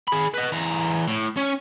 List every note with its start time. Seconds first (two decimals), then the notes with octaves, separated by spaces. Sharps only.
0.08 G#4 B5
0.34 B4 D#5
0.53 E2 A#5
1.08 A2
1.37 C#4